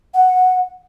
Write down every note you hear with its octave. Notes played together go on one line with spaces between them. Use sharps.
F#5